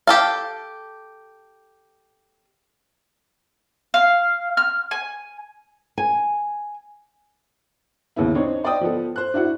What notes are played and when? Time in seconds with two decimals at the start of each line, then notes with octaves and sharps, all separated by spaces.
0.07 G4 A4 F5
3.94 F5
4.57 F6
4.91 G#5
5.98 G#5
8.16 D#2 C#3 B3 E4
8.35 C4 D4 D#4 C5 C#5
8.64 C5 D5 D#5 G5 D#6
8.81 F3 B3 A4
9.16 C5 F#6
9.34 D4 E4 F#4 F#5